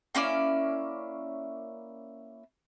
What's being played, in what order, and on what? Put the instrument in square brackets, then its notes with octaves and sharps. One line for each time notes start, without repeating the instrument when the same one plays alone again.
[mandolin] A#3 C#4 E4 D5